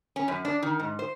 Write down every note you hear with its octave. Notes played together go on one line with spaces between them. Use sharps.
C#4
F#2
D4
D#3
G#2
C5